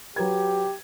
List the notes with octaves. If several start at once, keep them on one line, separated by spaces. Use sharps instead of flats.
F#3 G4 B4 G#6